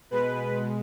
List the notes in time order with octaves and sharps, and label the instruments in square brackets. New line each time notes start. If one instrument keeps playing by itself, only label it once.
[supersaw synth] B2 G#3 B4